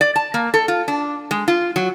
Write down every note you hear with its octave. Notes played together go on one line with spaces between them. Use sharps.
D5
A5
A#3
A4
F4
D4
G#3
F4
F#3